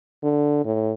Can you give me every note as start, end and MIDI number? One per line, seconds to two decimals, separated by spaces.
0.23 0.62 50
0.65 0.92 45